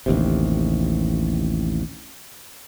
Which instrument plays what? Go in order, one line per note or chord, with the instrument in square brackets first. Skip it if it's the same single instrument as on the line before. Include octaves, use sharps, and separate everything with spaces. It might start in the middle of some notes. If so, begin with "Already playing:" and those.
[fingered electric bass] A1 D#2 C3